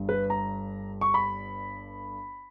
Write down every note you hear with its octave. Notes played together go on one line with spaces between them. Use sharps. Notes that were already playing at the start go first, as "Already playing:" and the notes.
Already playing: G1 G2 G3
B4
A#5
C#6
B5